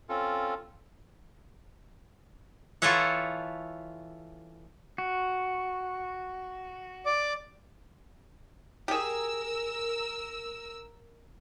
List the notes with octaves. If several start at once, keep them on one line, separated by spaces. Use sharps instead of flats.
C4 C#4 F4 A4
E3 F4 A4 C#5 E5 F#5
F#4
D5 D6
G4 G#4 A#4 E6